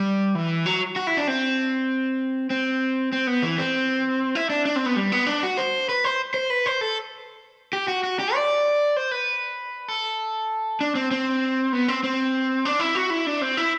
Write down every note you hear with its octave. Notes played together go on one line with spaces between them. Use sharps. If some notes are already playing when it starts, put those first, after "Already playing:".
Already playing: G3
E3
F#3
F#4
E4
D4
C4
C4
C4
B3
E3
C4
E4
D4
D4
C4
B3
G3
B3
D4
F#4
C5
B4
C5
C5
B4
C5
A4
G4
F#4
F#4
G4
D5
C5
B4
A4
D4
C4
C4
B3
C4
C4
D4
E4
F#4
E4
D4
C4
E4